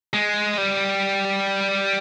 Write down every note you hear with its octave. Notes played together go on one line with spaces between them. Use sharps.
G#3
G3